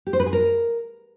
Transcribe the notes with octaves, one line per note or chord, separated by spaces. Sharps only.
G4
C5
B4
G#4
A#4